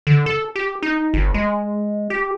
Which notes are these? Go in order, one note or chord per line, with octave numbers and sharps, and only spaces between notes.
D3
A4
G4
D#4
G1
G#3
G4